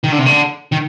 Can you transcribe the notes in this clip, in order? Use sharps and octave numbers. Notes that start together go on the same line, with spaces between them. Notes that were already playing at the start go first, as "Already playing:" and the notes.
D#3
D3
C3
D3
D#3